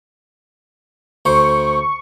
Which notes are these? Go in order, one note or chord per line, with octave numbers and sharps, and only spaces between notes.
D2 C5 C#6